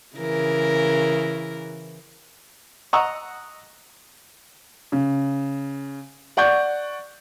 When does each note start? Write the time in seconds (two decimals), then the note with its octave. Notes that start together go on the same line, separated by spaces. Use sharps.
0.16 C#3 E3 A#4
2.93 D#5 F#5 A#5 C#6 D#6 E6
4.92 C#3
6.37 D5 F#5 C#6 G6